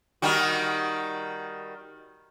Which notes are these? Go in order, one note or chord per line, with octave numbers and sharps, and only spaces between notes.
D#3 G3 F#4